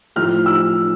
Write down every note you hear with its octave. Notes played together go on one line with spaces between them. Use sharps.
A2 F3 F6
E6